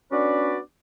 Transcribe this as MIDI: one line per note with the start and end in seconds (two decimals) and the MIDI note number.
0.12 0.58 59
0.12 0.58 61
0.12 0.58 62
0.12 0.58 66
0.12 0.58 71
0.12 0.58 74